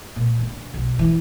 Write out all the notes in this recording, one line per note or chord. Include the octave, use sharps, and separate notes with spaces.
A#2
D3
B1
E3